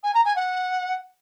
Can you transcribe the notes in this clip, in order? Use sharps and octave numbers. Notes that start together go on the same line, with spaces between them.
G#5
A#5
G#5
F#5